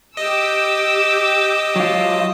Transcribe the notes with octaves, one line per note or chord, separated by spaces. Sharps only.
G4 D#5 D6 E6
F#3 F4